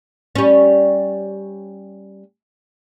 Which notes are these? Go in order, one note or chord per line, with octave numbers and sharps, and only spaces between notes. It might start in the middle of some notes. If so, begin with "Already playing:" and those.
G3 C#4